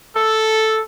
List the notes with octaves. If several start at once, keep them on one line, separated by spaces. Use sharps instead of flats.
A4